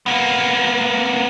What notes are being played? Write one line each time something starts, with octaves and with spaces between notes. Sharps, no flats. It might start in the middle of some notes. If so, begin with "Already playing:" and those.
A#3 B3